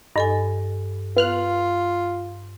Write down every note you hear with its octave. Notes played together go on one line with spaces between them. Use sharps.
G2 D#4 A4 G#5
B3 F4 F6 F#6